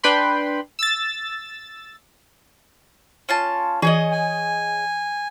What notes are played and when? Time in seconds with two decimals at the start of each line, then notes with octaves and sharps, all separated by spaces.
0.03 D4 B4 G5 B5 C6
0.79 E6 A6
3.29 C#4 F4 A5
3.82 E3 G#4 C#5 D#5
4.12 G#5